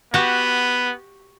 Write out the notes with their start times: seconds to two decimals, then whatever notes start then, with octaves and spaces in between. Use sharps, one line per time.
0.14 B3 F#4 G4